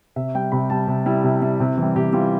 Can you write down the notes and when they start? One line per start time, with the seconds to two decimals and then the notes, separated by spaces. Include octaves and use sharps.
0.16 C3 E5
0.35 G3 G5
0.52 C3 B5
0.70 G3 A5
0.88 C3
1.06 G3 E4
1.24 C3
1.42 G3
1.60 C3
1.78 E3 G3
1.96 C3 G4
2.13 E3 G3 F4